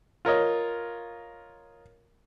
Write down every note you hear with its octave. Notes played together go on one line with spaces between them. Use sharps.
F4 A#4 C#5 D#5